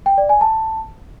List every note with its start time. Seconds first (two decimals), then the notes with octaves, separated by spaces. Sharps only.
0.06 G5
0.18 D5
0.29 G#5
0.41 A5